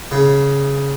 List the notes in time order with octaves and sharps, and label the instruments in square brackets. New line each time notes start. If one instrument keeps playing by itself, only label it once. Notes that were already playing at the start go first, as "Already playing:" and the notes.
[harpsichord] C#3